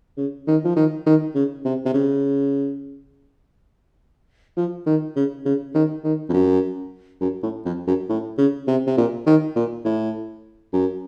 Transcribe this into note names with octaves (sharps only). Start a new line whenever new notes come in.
C#3
D#3
F3
D#3
D#3
C#3
C3
C3
C#3
F3
D#3
C#3
C#3
D#3
D#3
F2
F#2
F#2
A2
F2
F#2
A2
C#3
C3
C3
A#2
D#3
A#2
A2
F#2